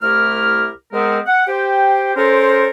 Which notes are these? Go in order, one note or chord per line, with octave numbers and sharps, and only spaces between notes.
C2 A3 E4 G4 A#4 F6
G#3 B3 C4 A#4
F#5
G4 C5 G5
C#4 A4 A#4 C5